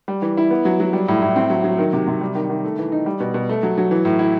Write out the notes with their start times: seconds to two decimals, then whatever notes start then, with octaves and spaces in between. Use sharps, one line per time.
0.08 G3
0.22 E3
0.37 E4
0.51 B3
0.65 F#3
0.80 F#3
0.93 G3
1.08 A2
1.22 A2
1.36 C4
1.50 F#3
1.64 F#3
1.78 D#3
1.93 C3
2.08 C3
2.21 G3
2.35 D#3
2.50 D#3
2.64 A3
2.78 E3
2.92 D#4
3.06 G3
3.20 B2
3.34 B2
3.49 A3
3.63 F#3
3.78 F#3
3.91 E3
4.05 A2
4.19 E4